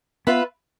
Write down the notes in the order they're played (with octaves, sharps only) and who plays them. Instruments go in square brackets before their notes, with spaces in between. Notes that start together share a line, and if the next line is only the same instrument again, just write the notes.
[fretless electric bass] B3 [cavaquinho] F4 B4 E5 B5